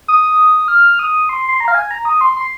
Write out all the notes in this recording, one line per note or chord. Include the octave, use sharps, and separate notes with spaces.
D#6
F6
D#6
C6
C6
A#5
F5
G#5
A#5
D#6
C6
C6